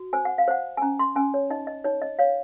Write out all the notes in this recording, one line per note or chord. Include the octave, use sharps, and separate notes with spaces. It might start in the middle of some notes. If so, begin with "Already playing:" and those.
Already playing: F#4
C5 G#5
F#5
F5
C5 F#5
G#5
C#4 A#5
C6
C#4 G#5
C#5
D#4 D#5
D#5
D#4 C#5
D#5
C#5 F5